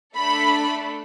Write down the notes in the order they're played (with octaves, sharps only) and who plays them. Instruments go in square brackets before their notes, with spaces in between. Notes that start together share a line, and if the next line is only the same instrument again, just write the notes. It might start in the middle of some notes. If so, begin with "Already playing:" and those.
[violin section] A3 D4 A4 B5